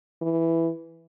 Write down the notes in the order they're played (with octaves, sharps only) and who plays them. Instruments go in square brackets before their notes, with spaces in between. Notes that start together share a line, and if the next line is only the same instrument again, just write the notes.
[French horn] E3